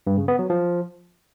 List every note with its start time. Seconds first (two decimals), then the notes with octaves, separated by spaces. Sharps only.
0.07 G2
0.17 C#3
0.28 B3
0.39 F#3
0.50 F3